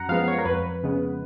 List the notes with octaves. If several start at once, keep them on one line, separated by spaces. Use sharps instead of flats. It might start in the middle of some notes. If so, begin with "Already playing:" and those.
Already playing: F#2 F#5 A#5
F3 G#3 B3 F5
C#5
A#4
F2 B4
C#3 G#3 B3